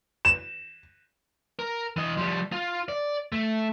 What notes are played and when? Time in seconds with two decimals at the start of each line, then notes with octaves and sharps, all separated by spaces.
0.25 E7
1.59 A#4
1.96 E3 D#5
2.17 F3 G3
2.52 F4
2.88 D5
3.32 A3